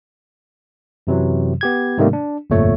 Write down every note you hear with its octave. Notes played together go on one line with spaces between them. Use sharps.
F#2 C3 E3 F#3
B3 G4 G#6
G#2 C3 D#3 G3 A3 A#3
D4
G1 F2 A#2 A3 C#5